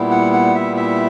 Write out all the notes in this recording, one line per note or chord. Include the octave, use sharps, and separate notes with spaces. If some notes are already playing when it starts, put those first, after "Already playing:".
Already playing: A#2 G3 B3 E4
F#5
F#5
E5
E5